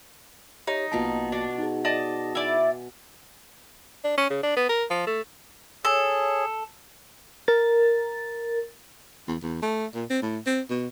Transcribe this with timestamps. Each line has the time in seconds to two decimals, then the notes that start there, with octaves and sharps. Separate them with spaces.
0.67 D#4 G4 C#5
0.92 A#1 B2 A#3 F4 A5 D6
1.32 D4 F#4
1.58 D#4 G#4
1.85 D5 D#5 A5
2.35 E4 D5 G#5
4.04 D4
4.18 C#4
4.30 C#3
4.43 D4
4.57 B3
4.69 A#4
4.90 F3
5.07 A3
5.85 G#4 A4 C#5
7.48 A#4 A6
9.28 E2
9.42 E2
9.62 A3
9.95 A#2
10.10 C4
10.23 A2
10.46 C4
10.70 B2